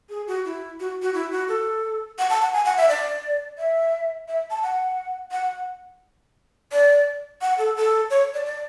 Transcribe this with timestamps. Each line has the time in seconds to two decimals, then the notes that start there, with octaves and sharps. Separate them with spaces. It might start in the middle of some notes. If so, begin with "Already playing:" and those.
0.10 G#4
0.27 F#4
0.45 E4
0.80 F#4
1.02 F#4
1.14 E4
1.31 F#4
1.48 A4
2.19 F#5
2.30 A5
2.41 F#5
2.53 G#5
2.65 F#5
2.77 E5
2.89 D5
3.58 E5
4.28 E5
4.50 A5
4.63 F#5
5.32 F#5
6.72 D5
7.41 F#5
7.58 A4
7.76 A4
8.10 C#5
8.34 D5
8.45 D5